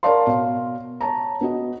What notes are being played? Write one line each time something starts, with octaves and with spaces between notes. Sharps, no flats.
A#4 C#5 D5 F5 A5 C6
B2 F5
C#5 A5 A#5
B3 F#4 D#5